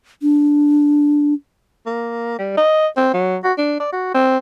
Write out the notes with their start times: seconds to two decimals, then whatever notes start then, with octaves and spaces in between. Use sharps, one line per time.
0.22 D4
1.86 A#3
2.38 G3
2.57 D#5
2.97 C4
3.13 F#3
3.44 F#4
3.58 D4
3.80 D5
3.92 F#4
4.14 C4